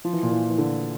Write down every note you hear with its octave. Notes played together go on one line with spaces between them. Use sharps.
F3
E3
A#2
E3
E3
D3